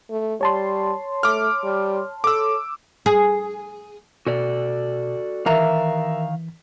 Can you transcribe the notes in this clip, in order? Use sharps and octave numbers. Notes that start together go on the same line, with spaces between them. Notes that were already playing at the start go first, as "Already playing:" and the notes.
A3
G3 C#5 A5 C6
A3 D6 F6
G3
A4 D6 E6
G#4
B2 F#4 A4 D5
D#3 E3 A#4 E5 F5 A#5